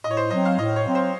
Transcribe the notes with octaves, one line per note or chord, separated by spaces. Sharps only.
A2 D#5
C#5
C5
F#3 C4 D#5
F5
A2 D#5
C#5
F#3 C4
C5